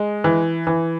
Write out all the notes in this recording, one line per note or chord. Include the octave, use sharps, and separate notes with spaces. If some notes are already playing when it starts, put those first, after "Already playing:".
Already playing: G#3
E3
E3